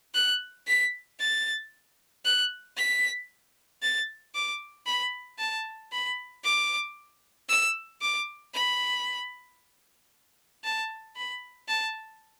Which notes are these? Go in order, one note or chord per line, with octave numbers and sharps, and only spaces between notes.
F#6
B6
A6
F#6
B6
A6
D6
B5
A5
B5
D6
E6
D6
B5
A5
B5
A5